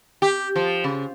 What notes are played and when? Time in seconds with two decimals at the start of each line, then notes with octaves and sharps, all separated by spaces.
0.22 G4
0.56 F3
0.84 C#3